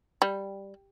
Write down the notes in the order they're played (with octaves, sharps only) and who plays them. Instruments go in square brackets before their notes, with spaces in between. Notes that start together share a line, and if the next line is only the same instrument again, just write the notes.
[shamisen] G3